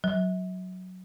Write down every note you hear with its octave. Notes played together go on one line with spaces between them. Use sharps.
F#3